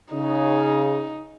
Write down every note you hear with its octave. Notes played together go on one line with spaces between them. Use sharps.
C#3 D#4